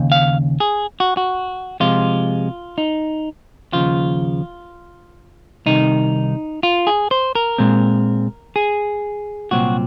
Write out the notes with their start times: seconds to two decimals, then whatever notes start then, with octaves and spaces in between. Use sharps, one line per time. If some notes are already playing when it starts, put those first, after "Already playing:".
Already playing: D#2 C#3
0.12 F5
0.60 G#4
1.00 F#4
1.17 F#4
1.80 C3 F3 G#3 F4
2.78 D#4
3.73 D#2 C#3 F3 F4
5.66 C2 C3 D#3 D#4
6.63 F4
6.87 G#4
7.11 C5
7.35 A#4
7.58 A#2 G#3 C4
8.56 G#4
9.51 C2 A#2 F#3 C4 F#4